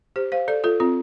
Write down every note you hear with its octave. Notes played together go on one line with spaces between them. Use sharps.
G4 C5
C5 F5
A4 D5
F4 A4
C4 F4